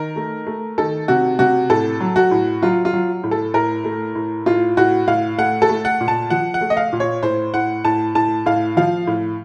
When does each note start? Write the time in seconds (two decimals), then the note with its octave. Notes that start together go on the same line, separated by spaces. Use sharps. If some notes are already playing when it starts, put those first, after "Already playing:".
Already playing: D#3 A#4
0.16 A3
0.47 A3
0.78 D#3 A4
1.08 C3 F#4
1.39 C3 F#4
1.70 A2 A4
2.00 F#3
2.16 F#4
2.31 A2
2.63 F#3 F4
2.85 F4
2.93 F#3
3.23 A2
3.31 A4
3.54 A2 A#4
3.84 A3
4.15 A2
4.46 A2 F4
4.77 A2 F#4
5.08 A2 F5
5.38 A3 F#5
5.62 A4
5.69 A3
5.85 F#5
6.01 A#2
6.08 A5
6.30 F3 F#5
6.54 F#5
6.61 A3
6.70 D#5
6.77 F5
6.93 A#2
7.00 C#5
7.23 A2 C5
7.54 A2 F#5
7.85 A2 A5
8.15 A2 A5
8.46 A2 F5
8.77 F3 F5
9.07 A2